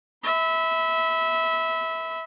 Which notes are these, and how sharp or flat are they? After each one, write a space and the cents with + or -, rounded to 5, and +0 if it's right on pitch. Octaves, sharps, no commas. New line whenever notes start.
E5 -20 B5 +25